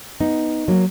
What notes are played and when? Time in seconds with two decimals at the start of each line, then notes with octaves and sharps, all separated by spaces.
0.20 B3 D#4
0.68 F#3 A#3